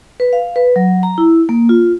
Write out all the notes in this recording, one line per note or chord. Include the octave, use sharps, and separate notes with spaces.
B4
F5
B4
F#3
A#5
E4
A#3
F4